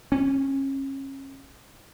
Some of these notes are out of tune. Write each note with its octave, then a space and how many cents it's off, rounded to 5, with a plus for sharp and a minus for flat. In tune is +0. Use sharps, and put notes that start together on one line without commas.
C#4 -30